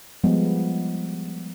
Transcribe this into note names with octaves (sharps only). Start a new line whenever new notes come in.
F3 G3 G#3 B3